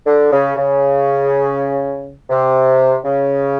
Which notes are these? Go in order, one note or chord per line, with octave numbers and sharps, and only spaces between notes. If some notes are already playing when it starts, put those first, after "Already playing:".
D3
C#3
C#3
C3
C#3